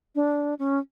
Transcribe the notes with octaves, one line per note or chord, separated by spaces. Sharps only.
D4
C#4